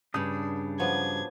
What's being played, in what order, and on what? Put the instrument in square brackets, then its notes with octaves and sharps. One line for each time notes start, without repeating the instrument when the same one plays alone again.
[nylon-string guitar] G2 C#3 [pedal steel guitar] D4 D#6 G6
[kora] F3 F#3 B3 [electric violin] G#6